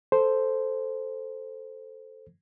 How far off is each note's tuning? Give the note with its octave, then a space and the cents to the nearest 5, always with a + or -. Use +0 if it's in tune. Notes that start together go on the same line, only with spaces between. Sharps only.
A4 +0 C5 +0